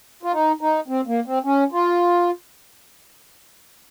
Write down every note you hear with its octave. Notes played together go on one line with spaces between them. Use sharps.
F4
D#4
D#4
C4
A#3
C4
C#4
F4